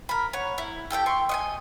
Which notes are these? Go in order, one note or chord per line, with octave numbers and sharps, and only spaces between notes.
A#4 B5
C#5 F#5
E4
G4 A4 E5 G5
G5 C6 C#6
D#5 F#5 G#5